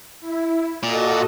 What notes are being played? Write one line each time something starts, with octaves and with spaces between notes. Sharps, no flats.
E4
A#2 F#4 A4 D#5